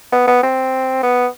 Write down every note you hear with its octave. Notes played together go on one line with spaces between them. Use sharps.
B3
B3
C4
B3